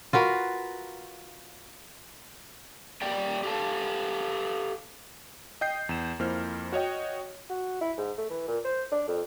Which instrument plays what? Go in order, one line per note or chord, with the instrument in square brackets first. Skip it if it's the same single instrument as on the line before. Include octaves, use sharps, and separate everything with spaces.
[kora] F4 F#4 A#4 B4
[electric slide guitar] A#2 G4 D5 G5
G4 A4 F5 A5
[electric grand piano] D#5 G5 G6 C7
E2 E7
F2 A#3 E4 C5 F6
F#4 C#5 D#5 G5
[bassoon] F#4
E4
G#2
A3
E3
A#2
C5
D4
F2